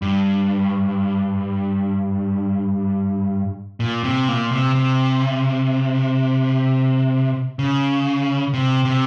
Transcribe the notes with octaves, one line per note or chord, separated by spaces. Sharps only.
G2
A#2
C3
A#2
C3
C3
C#3
C3
C3